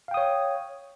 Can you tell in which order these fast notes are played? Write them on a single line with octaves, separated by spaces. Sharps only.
F5 G5 D#6 C#5